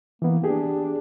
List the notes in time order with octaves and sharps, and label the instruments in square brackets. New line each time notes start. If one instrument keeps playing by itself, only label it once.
[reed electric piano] E3 B3 [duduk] A#3
[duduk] D4 [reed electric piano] G4 G#4